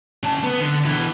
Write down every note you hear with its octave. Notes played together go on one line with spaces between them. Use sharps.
C#3 A5
B3
D3
B2 E3